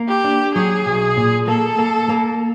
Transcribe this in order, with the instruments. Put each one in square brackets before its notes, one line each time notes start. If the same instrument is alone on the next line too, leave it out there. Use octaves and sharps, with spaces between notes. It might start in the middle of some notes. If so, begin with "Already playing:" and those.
Already playing: [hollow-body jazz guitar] A#3
[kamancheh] G4
[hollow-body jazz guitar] D4
[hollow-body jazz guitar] F#3 [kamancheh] G#4
[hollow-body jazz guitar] B1
A#2
[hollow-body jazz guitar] A#3 [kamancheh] A4
[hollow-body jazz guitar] A#3
A#3